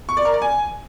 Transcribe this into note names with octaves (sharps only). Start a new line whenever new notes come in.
C#6
D5
A#4
D5
G#5